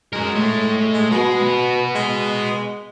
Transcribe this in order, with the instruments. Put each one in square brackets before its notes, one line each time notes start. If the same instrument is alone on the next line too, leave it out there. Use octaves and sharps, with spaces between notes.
[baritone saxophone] G#3 [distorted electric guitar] F#4 A#4
[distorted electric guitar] A3 C#5
[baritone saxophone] G#3
[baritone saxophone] B2 [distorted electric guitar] G#3 G#4
[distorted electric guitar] B3 F#4
[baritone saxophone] G#3